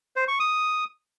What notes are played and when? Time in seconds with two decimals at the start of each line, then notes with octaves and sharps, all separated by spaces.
0.16 C5
0.28 C#6
0.40 D#6